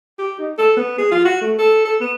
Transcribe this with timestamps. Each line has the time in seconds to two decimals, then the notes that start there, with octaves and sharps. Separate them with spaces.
0.19 G4
0.39 D#4
0.58 A4
0.77 B3
0.98 G#4
1.11 F4
1.25 F#4
1.41 A3
1.59 A4
1.85 A4
2.01 B3